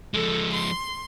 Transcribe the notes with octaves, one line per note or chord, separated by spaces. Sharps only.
F3 G#3 A4
C6